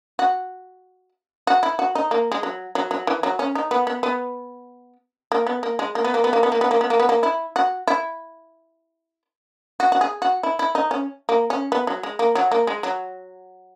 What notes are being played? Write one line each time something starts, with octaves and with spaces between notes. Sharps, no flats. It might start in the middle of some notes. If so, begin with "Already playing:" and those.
F#4
F#4
E4
F#4
D#4
A#3
G#3
F#3
F#3
F#3
E3
F#3
C#4
D#4
B3
B3
B3
A#3
B3
A#3
G#3
A#3
B3
A#3
B3
A#3
B3
A#3
B3
A#3
B3
A#3
B3
A#3
E4
F#4
E4
F#4
F#4
G#4
F#4
E4
E4
D#4
C#4
A#3
C#4
B3
F#3
G#3
A#3
F#3
A#3
G#3
F#3